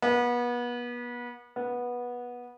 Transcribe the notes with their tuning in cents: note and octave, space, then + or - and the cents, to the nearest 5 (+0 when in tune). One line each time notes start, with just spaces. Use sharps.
B3 -30
B3 -15